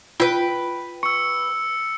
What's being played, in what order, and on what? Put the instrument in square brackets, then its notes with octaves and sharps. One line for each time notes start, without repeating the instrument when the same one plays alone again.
[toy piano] F4 [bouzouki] B4 G5
[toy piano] C#6 [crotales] E6 C#7